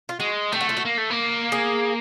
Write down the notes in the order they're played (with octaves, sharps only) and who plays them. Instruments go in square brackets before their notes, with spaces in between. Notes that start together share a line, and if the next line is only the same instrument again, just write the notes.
[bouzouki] F4
[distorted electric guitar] G#3 [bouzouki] F#4
[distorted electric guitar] A3 [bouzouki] G4
[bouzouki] F#4
F4
F#4
[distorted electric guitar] A#3
A3
A#3
[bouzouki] G#4